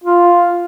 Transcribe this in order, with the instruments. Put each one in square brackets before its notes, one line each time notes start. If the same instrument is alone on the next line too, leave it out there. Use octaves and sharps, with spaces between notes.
[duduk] F4